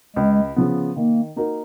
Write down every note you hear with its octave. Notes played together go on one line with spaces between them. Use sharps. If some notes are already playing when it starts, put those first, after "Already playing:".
C#2 G#3
C#3 F3 B3
D#3 A#3
A#3 D#4 F#4 A#4